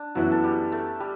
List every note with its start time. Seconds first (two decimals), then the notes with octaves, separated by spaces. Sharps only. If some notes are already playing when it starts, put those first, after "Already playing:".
Already playing: D4
0.15 F#2 E3 F#3 B3 E4 F#4
0.32 A4
0.44 G3 G4
0.72 A3 A4
1.00 G3 G4